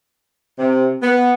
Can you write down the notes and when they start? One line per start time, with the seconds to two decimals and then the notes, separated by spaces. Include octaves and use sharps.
0.58 C3
1.02 B3